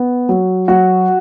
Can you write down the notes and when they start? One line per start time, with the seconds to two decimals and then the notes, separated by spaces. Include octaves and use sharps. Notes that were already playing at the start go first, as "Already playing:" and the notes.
Already playing: B3
0.29 F#3
0.68 F#3 F#4